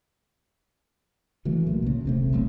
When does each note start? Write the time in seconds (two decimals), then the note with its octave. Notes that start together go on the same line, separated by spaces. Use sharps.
1.45 C#3 E3 F#3 A3
1.67 B1 A#2
1.82 B1 C#3
2.05 D#1 C3 A3
2.33 F1 F#3 B3